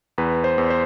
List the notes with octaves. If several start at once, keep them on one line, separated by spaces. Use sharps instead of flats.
E2 B4
C5
E2
C5